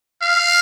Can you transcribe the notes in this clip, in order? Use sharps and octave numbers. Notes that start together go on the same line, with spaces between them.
F5